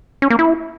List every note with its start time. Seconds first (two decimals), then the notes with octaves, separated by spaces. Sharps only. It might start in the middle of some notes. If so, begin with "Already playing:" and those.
0.22 C#4
0.30 A#3
0.39 E4